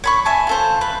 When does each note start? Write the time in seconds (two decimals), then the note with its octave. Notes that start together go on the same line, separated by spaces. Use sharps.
0.04 C#5 B5 C#6
0.25 E5 G#5 A5
0.47 F4 A4 C5
0.81 B4